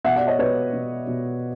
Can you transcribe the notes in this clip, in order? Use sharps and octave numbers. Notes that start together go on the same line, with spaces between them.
B2 E5 F#5
D5 E5
C#5 D#5
B2 B4 C#5
B2
B2